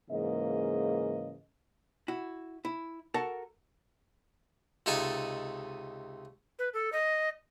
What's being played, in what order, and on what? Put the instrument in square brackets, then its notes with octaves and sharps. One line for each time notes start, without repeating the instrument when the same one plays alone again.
[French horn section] G#2 C#3 E3 A#3 D#5
[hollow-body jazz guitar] E4 F#4
E4
F#4 A4 A#4 F#5 A5
[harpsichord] C#2 C3 D#4 A4 G#5 A5
[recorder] B4
A4
D#5